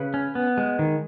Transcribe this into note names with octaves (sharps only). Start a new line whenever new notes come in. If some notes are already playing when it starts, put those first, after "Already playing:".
Already playing: C#3 B4
C#4
B3
G#3
D#3